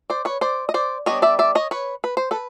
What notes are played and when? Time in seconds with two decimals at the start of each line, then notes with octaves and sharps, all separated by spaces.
0.10 C5 D5
0.25 B4 C#5
0.41 C5 D5
0.69 D#5
0.74 C5 D5
1.06 G3 B3 D4 C#5 D#5
1.22 D5 E5
1.39 D5 E5
1.55 C#5 D#5
1.71 B4 C#5
2.04 B4
2.17 C5
2.31 A4 B4